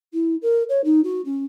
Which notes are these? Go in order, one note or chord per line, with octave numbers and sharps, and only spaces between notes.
E4
A#4
C#5
D#4
F#4
C#4